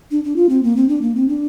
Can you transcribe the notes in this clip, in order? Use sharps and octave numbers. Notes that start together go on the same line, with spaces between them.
D4
D4
F4
C4
A#3
C4
D4
A#3
C4
D4